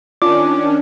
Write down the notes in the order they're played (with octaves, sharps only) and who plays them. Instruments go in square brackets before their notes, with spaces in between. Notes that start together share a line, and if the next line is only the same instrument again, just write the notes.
[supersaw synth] D#3 C#4 D4 [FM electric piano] F4 D5 [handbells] D6